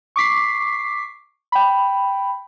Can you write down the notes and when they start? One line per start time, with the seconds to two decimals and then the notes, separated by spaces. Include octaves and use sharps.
0.16 C#6 D6 B6 C7
1.52 G5 B5